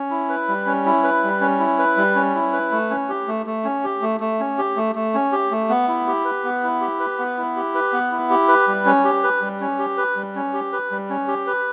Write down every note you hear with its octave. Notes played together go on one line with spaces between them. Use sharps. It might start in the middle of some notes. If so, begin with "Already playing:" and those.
Already playing: C#4
E4
B4
G3
C#4
E4
B4
G3
C#4
E4
B4
G3
C#4
E4
B4
A3
C#4
G4
A3
A3
C#4
G4
A3
A3
C#4
G4
A3
A3
C#4
G4
A3
B3
E4
G4
B4
B3
E4
G4
B4
B3
E4
G4
B4
B3
E4
G4
B4
G3
C#4
G4
B4
G3
C#4
G4
B4
G3
C#4
G4
B4
G3
C#4
G4
B4